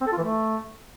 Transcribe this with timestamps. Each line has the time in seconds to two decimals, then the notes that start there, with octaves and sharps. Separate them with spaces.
0.01 C4
0.07 A4
0.12 F4
0.18 E3
0.24 A3